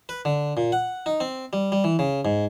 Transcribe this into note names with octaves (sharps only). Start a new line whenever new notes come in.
B4
D3
A#2
F#5
D#4
C4
G3
G3
E3
C#3
G#2